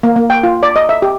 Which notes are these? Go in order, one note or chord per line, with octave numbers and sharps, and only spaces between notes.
A#3
A#3
G5
F4
D5
D#5
E5
G4